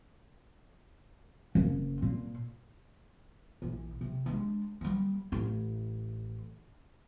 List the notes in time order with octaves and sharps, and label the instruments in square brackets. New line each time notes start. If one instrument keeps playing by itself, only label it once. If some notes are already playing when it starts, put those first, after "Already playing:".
[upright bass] F#1
A#2
A#1 E3
C3
G#3 D4
G3 A#3
A1 E4